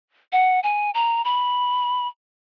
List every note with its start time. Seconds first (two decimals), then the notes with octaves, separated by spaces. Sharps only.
0.32 F#5
0.63 G#5
0.94 A#5
1.25 B5